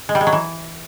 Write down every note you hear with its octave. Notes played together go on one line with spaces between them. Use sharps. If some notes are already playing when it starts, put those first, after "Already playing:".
G#3
G3
G#3
F#3
E3